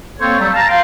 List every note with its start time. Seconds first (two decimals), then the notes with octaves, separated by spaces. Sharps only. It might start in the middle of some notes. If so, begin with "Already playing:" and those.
0.20 A#3 C4 A4 C5 C#5
0.39 F#3 G3 A3
0.54 F5 A5 A#5
0.69 F5 G5 C6